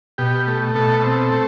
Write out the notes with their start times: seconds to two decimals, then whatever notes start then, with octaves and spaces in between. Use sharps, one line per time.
0.18 B2 G4
0.47 A3
0.75 B2 A4
1.04 C4
1.32 A3